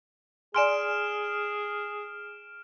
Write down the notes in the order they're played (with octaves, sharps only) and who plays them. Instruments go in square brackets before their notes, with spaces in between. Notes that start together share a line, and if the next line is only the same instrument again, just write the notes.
[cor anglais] G#4 [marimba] D5 G#5 C6 [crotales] F6 D7 E7